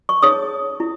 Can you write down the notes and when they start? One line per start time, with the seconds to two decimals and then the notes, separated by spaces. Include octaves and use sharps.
0.09 C#6
0.22 D#4 G#4 C#5 D#6
0.80 E4